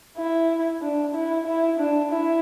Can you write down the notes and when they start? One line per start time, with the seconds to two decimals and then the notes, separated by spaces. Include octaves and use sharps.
0.17 E4
0.82 D4
1.15 E4
1.46 E4
1.79 D4
2.11 E4